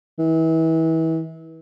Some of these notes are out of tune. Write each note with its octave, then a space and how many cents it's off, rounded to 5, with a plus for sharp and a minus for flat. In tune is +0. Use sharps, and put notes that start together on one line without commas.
E3 -30